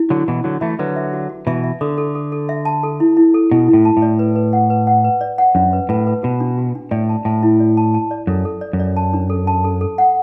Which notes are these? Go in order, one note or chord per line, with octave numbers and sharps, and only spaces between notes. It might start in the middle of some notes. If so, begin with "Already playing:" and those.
Already playing: E4
D3 F#3 F#4
B2 E3 F#4
D3 F#3 F#4
E3 A3 E5
D3 F#3 B4
E5
F#4
F#4
B2 E3 E5
E5
D3 A4
A4
A4
A4
E5
A5
A4
E4
E4
A4
B2 E4
E4
A2
A5
A2
D5
B4
B4
F#5
B4
F#5
B4
D5
F#5
F#2 D4
B4
A2 B4
B4
B2 F#4
D4
F#4
D4
A2 D5
A5
A2 A5
E4
D5
A5
A5
D5
F#2 A4
A4
D5
F#2
D5
A5
D4
A4
A5
A4
A4
F#5